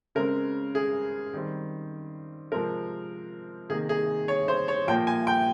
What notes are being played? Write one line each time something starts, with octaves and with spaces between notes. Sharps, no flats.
C#3 G#3 C4 A#4
G#4
D#3 G3 C4
C3 F3 G#3 C4 A#4
C3 D#3 A#3 G#4
G#4
C#5
C5
C#5
A#2 F3 A#3 G5
G#5
G5